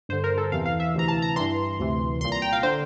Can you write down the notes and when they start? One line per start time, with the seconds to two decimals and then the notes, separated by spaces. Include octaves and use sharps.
0.09 G2 D3 C5
0.24 A#4
0.38 A4
0.52 E2 C3 E3 F5
0.66 F5
0.80 E5
0.94 D2 C3 E3 A#5
1.08 A5
1.22 A#5
1.36 G2 E3 C6
1.79 D2 C3 E3
2.21 C2 C6
2.25 A#2
2.32 A#5
2.42 G5
2.53 F5
2.63 D3 C5